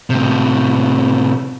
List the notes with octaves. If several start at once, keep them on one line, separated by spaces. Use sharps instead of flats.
A2 C3